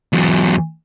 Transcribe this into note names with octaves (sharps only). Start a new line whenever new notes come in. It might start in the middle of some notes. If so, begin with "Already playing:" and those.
E2 F#3